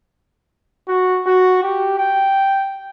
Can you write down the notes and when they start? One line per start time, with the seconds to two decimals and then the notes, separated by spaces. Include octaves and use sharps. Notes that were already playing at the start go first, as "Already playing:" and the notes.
0.88 F#4
1.26 F#4
1.63 G4
1.98 G5